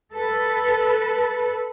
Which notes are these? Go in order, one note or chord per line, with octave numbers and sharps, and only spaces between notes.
A4 B4